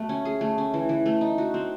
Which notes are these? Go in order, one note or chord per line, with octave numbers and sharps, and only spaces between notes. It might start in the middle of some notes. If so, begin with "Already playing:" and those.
Already playing: A3 F#4
C#4
G#4
A3
C#4
E3
E3
A3
D#4
F#4
C4